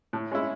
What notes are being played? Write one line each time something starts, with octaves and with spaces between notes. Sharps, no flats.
A2
G#3 C#4 E4